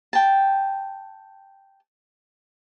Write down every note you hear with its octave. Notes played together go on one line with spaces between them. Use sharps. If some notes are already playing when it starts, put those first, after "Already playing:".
G5 A5